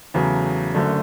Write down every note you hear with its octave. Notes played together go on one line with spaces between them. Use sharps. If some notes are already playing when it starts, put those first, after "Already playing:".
E2 C#3 F#3 A3
F#1 F#2 D3 A3 D4